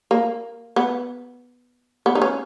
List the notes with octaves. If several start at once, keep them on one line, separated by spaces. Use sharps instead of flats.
A#3
B3
B3
D#4
C#4